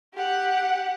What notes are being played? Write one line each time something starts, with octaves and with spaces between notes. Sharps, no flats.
G4 F#5